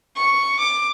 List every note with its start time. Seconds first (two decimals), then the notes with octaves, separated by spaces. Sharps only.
0.17 C#6
0.59 D6